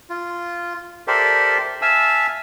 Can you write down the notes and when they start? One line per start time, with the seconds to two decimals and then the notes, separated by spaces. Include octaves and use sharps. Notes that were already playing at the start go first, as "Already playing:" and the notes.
0.10 F4
1.07 G4 A4 A#4 C5 D5 E5
1.82 E5 F5 G#5 A5 E6